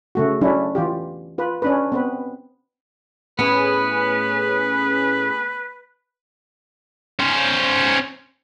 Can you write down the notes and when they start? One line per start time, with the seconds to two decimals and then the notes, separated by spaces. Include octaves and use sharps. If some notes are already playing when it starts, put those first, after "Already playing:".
0.15 C#3 A3 F#4
0.41 F#3 C#4 D4 E4
0.75 E3 F4 G4
1.38 F4 B4
1.62 C#4 D4 B4
1.92 B3 C4 B4
3.39 A2 B3 C#4 G#4 B4
7.19 C#4 C5